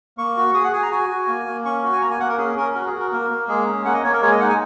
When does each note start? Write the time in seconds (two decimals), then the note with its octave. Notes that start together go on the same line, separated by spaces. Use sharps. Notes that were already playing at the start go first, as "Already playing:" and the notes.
0.18 A#3 C#6
0.37 F#4
0.54 G#4 D#6
0.64 F#5
0.72 G#4 G#5
0.82 A#5
0.91 F#4 G#5
1.09 F#4
1.28 A#3
1.46 A#3
1.65 C#4 C#6
1.83 F#4
1.93 G#5
2.01 A#3 A#5
2.11 G#5
2.20 A#3 F#5
2.29 A#4
2.38 C#4 G#4
2.56 C#4 A#4
2.75 F#4 A#4
2.87 G#4
2.93 F#4
2.99 A#4
3.11 A#3 A#4
3.30 A#3
3.48 G#3 G#4
3.67 C#4
3.85 A#3 F#5
3.94 D#5
4.03 A#3 C#5
4.13 A#4
4.22 G#3 C#5
4.31 D#5
4.40 D#4 F#5
4.49 G#5